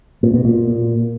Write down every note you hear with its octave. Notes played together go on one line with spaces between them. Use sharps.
A#2
B2
A#2